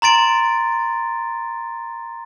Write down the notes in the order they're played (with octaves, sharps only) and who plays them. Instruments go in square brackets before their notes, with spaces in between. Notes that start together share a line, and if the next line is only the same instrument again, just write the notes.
[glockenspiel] A#5 C6 A6 D7